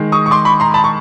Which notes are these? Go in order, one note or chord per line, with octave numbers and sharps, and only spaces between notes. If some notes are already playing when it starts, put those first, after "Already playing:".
Already playing: D#3 G#3
C#6 D#6
C#6
C6 D6
B5 C#6
A#5 C6
A5 B5
C#6